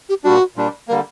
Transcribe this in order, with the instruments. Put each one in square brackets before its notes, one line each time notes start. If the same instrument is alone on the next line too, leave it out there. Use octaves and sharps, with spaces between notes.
[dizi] G4
[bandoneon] A#2 G3 D4 [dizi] F#4
[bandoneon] A#2 G3 D4
[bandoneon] D3 G3 A#3 [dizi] A#4